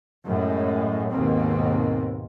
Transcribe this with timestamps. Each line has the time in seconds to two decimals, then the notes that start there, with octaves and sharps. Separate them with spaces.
0.25 F#2 A2 G#3
1.09 D#2 G#2 B2 A#3 C4